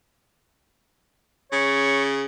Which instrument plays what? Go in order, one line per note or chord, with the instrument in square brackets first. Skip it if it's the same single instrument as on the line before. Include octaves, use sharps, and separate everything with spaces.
[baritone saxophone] C#3 [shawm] C#5